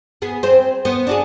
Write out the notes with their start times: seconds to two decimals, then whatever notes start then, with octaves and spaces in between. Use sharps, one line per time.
0.22 B3 G#4
0.43 C4 G#4 C5
0.85 B3 C5
1.07 D4 F#4 G#4